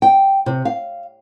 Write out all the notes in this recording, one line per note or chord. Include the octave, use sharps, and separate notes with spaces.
G5
C3
F5